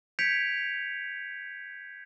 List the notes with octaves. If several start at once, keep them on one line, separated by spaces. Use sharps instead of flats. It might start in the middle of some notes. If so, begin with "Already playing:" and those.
G6 G#6 B6 C#7 D7 F7